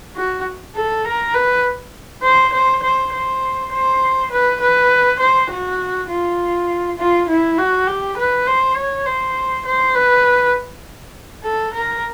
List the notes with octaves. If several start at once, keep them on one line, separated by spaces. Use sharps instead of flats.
F#4
A4
A#4
B4
C5
C5
C5
C5
C5
B4
B4
C5
F#4
F4
F4
E4
F#4
G4
B4
C5
C#5
C5
C5
B4
A4
A#4